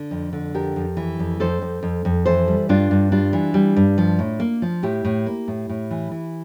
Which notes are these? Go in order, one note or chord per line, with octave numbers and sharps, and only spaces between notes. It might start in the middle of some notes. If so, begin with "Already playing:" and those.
Already playing: D3
F2
D3
F2 G4 A#4
F2
E3
F2
F2 A4 C5
F2
F2
F2
E3 A4 C5
G3
G2 D4 F4
G2
G3 D4 F4
E3
G3
G2
F3
A2
A#3
F3
A2 E4 G4
A2
A#3
A2
A2
E3
E3